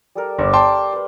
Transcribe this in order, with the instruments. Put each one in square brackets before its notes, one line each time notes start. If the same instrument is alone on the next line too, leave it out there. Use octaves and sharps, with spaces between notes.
[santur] G3 A4 A#4
[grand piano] G1 [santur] D5
[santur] D5 D6 [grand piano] G5 A5 C6
[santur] B4 C5